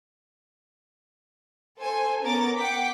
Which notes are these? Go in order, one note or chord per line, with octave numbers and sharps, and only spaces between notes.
A4 C5 G#5
B3 C#4 A#4 A#5 D6 A6
F#5 G5 D6 B6